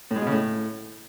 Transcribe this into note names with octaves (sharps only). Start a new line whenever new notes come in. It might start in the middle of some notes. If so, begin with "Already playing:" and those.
A2
G#3
B2
C#3
A2